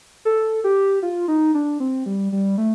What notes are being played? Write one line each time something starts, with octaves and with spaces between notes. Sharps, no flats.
A4
G4
F4
D#4
D4
C4
G3
G3
A3